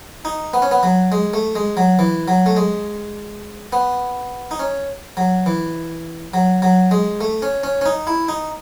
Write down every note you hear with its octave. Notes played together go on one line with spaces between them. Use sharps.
D#4
B3
C#4
B3
F#3
G#3
A3
G#3
F#3
E3
F#3
A3
G#3
B3
D#4
C#4
F#3
E3
F#3
F#3
G#3
A3
C#4
C#4
C#4
D#4
E4
D#4